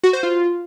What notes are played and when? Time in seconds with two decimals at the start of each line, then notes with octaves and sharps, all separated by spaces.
0.04 F#4
0.13 C5
0.23 F4